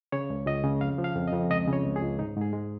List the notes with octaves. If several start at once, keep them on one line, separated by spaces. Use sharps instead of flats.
C#3 C#5
C#2
C#2 D#5
C#3
F2 F5
F3
F5
F2
D#5
F2
C#2 D#5
C#3 C#5
C#2
G#4
C#2
G#2 D#4
G#2 G#4
G#3